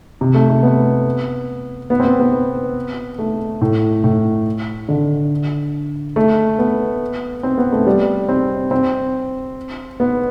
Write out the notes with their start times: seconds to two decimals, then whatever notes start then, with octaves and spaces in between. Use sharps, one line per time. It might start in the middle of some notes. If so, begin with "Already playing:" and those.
0.21 C3
0.34 A3
0.50 A3
0.63 B3
1.90 B3
2.00 C4
2.05 B3
2.20 B3
3.19 A3
3.61 A2
4.04 A2
4.89 D3
6.16 A3
6.59 B3
7.43 C4
7.58 B3
7.72 A3
7.86 G3
8.29 C4
8.71 C4
10.00 B3